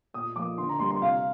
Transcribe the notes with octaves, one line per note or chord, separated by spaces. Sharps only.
A#2 D#6
F3 A#3 D6
D3 C6
A#5
G3 A#3 C6
C6
C3 F5